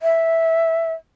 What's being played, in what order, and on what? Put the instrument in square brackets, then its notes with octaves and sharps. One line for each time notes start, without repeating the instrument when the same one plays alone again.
[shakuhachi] E5